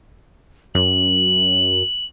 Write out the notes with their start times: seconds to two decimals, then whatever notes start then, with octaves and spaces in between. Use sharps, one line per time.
0.75 F#2 F#7